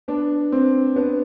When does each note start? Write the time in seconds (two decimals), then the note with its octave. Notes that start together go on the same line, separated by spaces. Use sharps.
0.08 B3 D4
0.52 C4
0.95 B3 D4